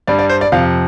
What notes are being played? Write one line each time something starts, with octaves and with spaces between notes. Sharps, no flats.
G2 G3 D5
D5
C5
D5
F2 C3 F3 F5